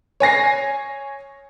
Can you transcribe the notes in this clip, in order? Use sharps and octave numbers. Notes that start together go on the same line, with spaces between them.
C#5 G#5 A#6 C7